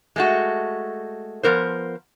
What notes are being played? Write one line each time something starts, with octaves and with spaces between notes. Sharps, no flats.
G#3 A3 F#4
F3 B3 A#4 C5